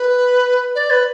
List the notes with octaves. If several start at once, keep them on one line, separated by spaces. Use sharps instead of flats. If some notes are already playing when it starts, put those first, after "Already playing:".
Already playing: B4
D5
B4